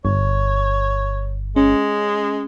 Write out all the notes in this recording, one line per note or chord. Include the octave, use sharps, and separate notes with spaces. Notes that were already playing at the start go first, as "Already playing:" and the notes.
G1 C#5
G#3 C#4